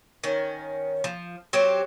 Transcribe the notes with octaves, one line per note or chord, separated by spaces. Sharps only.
D#3 C#4
F3
F#3 C4 G4